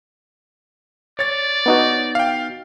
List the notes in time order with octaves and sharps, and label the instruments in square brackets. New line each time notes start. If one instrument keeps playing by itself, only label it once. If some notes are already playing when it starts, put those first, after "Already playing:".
[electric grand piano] C#5 A6 [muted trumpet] D5
[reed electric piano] B3 D#4 F#4
[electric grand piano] F5 G5